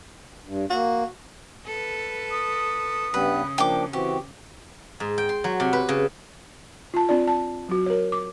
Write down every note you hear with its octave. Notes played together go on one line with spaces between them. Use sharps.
G2
A#3 F#4
A4 B4
D#6
G2 C#3 G3 B3 B4
F3 A#3 D4 G5 D6
E3 C4 F#4 G4
G#2
G5
C6
F#3
C3
B4
C#3
F4 A5
C4 D4 F4 D5
A5
F#3 F#4
A#4 C#5
D6